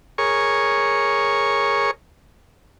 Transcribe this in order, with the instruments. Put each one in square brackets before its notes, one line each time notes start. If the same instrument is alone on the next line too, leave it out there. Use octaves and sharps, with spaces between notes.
[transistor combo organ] G#4 A#4 C#5 C#6